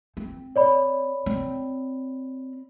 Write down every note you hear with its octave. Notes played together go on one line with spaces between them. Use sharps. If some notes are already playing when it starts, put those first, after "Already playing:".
C4
C#5 D5 B5
C4